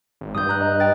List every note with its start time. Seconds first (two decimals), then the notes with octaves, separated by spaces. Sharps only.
0.21 G#1
0.35 G2 D#6 G6
0.49 A#5 F#6
0.61 D#5
0.80 D#5 G5 A6